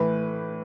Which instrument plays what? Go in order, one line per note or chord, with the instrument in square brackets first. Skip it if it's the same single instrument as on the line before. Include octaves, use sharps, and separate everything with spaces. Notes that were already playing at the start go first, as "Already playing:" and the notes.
Already playing: [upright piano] A2 E3 B4